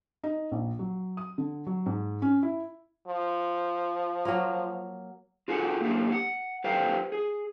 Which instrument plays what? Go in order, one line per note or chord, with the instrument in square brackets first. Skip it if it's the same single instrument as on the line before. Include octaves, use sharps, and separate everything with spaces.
[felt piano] D#4
A#1
F#3
D#6
D3
F#3
G#2
C#4
E4
[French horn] F3
[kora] F#3 A#3
[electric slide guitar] F4 F#4 G#4 A4 F#5
A3 A#3 D4 G4
F#5
G4 A4 B4 C5 F5 G5
G#4